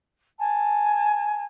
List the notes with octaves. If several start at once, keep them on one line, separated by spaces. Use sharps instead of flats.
G#5 A5